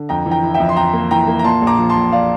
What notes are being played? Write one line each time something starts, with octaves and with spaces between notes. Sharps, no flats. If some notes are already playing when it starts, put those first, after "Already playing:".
Already playing: D3
F2 G5 A#5
E3
G5 A#5
E4
E5 G5
F2
C6
F2 G5 A#5
A#3
E3 G5 A#5
A#3
A#5
A#2 A5 C6
A#1
A#5 D6
F3
A5 C6
A#1
D5 F5